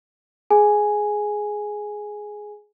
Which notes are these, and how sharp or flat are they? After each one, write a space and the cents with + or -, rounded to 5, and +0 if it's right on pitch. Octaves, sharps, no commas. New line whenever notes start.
G#4 +10 G#5 +0